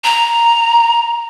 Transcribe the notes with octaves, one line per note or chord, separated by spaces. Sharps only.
A#5